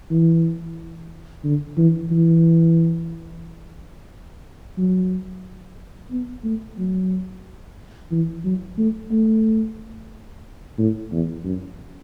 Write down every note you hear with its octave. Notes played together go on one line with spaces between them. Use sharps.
E3
D3
E3
E3
F#3
B3
A3
F#3
E3
F#3
A3
A3
A2
E2
F#2